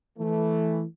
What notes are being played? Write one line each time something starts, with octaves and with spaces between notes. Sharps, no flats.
E3 A3